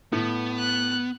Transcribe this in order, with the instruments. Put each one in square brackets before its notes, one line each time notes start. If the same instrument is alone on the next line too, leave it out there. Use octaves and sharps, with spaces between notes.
[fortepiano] A2 [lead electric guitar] B3
[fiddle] F#6